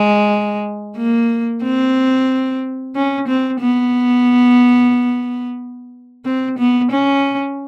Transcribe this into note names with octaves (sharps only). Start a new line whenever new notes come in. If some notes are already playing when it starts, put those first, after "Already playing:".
Already playing: G#3
A#3
C4
C#4
C4
B3
C4
B3
C#4